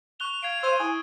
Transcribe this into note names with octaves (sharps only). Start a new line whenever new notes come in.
C#6 F#6 F7 G7
F5 G#6 C7 D7
C5 E6 D#7
E4 G#5 D#6